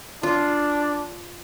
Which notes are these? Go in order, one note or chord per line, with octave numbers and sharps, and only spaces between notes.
D4 F4